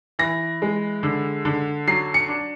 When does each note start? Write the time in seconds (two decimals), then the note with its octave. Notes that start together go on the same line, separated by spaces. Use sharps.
0.19 E3 A#6
0.62 G#3
1.03 D3
1.45 D3
1.87 F#3 C7
2.14 C#7
2.28 D4